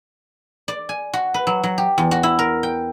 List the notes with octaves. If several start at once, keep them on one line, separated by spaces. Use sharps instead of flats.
D5
G#5
F#4
B4
F#3
F#3
G4
E2
F#4
E4
A#4
G5